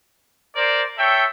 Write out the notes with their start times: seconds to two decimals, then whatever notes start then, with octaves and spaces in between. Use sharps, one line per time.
0.55 A#4 C5 D5
0.98 A4 C#5 E5 G5